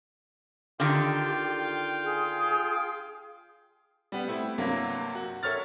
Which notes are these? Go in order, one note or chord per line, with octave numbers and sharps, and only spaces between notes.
D3 D#3 F4 G4 F5 G5
G#4
G3 B3
A3 C4 E4
G2 C3 F#3 A#3
F#4
A4 A#4 C#5 E5 F6 A6